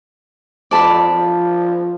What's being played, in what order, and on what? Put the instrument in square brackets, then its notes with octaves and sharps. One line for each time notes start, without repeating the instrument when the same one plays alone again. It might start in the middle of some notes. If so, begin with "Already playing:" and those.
[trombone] F2 [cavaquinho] D5 A5 B5
[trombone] F3